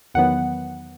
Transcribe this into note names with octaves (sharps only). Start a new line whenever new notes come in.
E2 D#3 F#3 B3 F#5